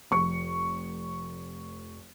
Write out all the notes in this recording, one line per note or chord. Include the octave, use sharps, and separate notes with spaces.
F1 C#6 C#7